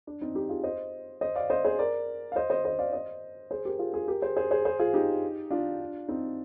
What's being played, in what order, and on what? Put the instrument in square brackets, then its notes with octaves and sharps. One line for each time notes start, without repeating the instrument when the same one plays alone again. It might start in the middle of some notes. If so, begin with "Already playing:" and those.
[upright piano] D4
C4 D#4
D#4 G4
F4 G#4
C5 D#5
C5 D#5
D5 F5
C5 D#5
G#4 C5
A#4 D5
F5
C5 D#5
C5 D#5
C5 D#5
D5 F5
C5 D#5
G#4 C5
G4 A#4
F4 G#4
F4 G#4
G4 A#4
G#4 C5
G#4 C5
G#4 C5
G#4 C5
F4 G#4
D#4 G4
D4 F4
C4 D#4